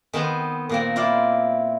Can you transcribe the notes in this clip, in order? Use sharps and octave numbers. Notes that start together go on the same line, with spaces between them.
D#3 B3 C4 C5
A#2 A#3 C4
E4 F4 D5 F5